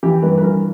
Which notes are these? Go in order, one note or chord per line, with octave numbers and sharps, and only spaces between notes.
E3 G4
G2 B4
B4
E3 A#4